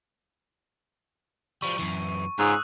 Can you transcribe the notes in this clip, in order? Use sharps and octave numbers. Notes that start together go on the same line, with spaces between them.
F3 G3 C#6
F#2 E3
G#2 C#4 F4 D#6 E6 F#6